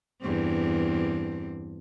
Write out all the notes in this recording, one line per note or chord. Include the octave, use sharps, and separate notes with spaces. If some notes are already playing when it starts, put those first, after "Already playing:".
E2 G2 C4